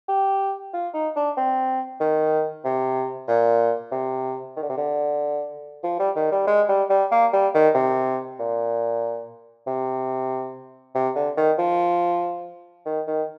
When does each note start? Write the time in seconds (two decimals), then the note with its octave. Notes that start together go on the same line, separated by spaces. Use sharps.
0.09 G4
0.73 F4
0.94 D#4
1.16 D4
1.37 C4
2.00 D#3
2.64 C3
3.28 A#2
3.92 C3
4.56 D#3
4.62 D3
4.69 C3
4.77 D3
5.83 F3
5.99 G3
6.16 D#3
6.32 G3
6.47 G#3
6.69 G3
6.90 G3
7.11 A#3
7.33 G3
7.54 D#3
7.75 C3
8.39 A#2
9.67 C3
10.95 C3
11.15 D3
11.37 D#3
11.58 F3
12.86 D#3
13.07 D#3